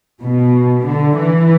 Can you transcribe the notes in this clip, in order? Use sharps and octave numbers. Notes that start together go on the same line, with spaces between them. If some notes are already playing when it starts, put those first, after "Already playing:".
B2
D3
E3